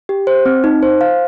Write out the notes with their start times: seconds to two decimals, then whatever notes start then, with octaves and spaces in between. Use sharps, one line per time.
0.09 G4
0.27 C5
0.46 C4
0.64 D#4
0.83 C5
1.01 F5